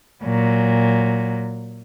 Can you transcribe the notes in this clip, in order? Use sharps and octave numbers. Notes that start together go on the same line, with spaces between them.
A#2 F#3